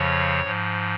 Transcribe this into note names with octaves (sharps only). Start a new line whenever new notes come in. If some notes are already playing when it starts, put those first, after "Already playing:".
Already playing: F2 C#3 F3 C#5
G#2 F3